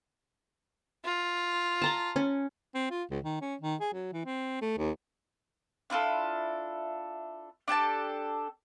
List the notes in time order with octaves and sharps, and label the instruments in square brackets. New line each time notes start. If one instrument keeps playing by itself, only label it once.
[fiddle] F4
[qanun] A5 A#5 C6
C#4
[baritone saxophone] C4
F4
C#2
D#3
C#4
D#3
G#4
F#3
E3
C4
A3
D#2
[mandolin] D4 E4 F4 A4
D4 G4 A4 A5